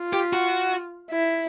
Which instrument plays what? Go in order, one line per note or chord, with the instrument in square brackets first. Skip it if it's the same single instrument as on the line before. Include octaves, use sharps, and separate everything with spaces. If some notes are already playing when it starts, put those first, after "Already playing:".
Already playing: [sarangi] F4
[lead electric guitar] G4
F#4
[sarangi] E4